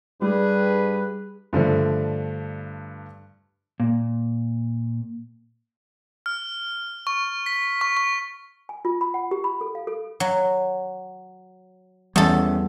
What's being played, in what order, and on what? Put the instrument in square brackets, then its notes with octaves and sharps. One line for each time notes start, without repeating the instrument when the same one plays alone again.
[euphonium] G2 [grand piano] G3 [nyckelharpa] G#4 [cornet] B4
[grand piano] G2 D3 F3 A3
[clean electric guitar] A#2
[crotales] F6
C#6
B6
C#6
C#6
[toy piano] G#5
F4
B5
F#5
G4
B5
A4
F5
A4
[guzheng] F#3
[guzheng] E2 A4 [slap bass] G3 C#4